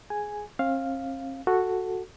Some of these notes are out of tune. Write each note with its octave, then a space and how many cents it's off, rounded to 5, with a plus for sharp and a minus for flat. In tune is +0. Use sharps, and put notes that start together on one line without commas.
G#4 +10 G#5 +0
C4 +45 F5 +0
F#4 +0 A4 +0